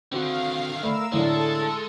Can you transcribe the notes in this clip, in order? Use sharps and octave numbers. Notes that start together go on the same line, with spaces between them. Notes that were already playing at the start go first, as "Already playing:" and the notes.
D3 D#3 C4 F#4 F5 F#5
A3 A#4 B5 E6
A2 D3 G#3 A4 C#5